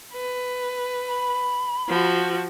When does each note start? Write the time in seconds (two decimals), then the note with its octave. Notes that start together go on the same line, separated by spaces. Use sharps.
0.13 B4
1.08 B5
1.89 F3 F#4